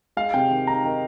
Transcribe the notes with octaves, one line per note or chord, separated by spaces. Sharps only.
G#3 F5
C3 G5
D#3
D#4 A#5
D#3